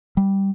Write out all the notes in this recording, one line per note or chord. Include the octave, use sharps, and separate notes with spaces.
G3